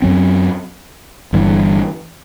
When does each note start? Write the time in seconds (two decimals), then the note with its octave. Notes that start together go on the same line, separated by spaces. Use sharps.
0.02 F#2 F#3 C4
1.33 G1 G2 E3